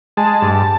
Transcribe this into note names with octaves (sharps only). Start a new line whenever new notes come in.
G#3 A5
G2
A5